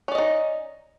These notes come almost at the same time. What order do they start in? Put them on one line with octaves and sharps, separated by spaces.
C#4 D5 D#5 D#4